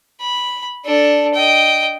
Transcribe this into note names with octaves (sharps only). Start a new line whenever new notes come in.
B5
D4 A4
D#5 G5